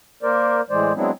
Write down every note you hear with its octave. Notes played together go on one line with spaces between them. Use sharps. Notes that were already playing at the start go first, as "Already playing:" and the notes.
A#3 A#4 C5 D5
A2 E3 G#3 C5 D5
F#3 G#3 B3 C4 D4 E4